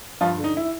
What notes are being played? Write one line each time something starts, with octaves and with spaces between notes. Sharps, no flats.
G2 F3 F4
D3
D#4
E4